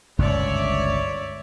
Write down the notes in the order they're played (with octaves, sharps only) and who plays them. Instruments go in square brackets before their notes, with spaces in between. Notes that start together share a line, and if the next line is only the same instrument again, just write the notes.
[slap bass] G1 C#2 G2 [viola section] C#5 D5 E5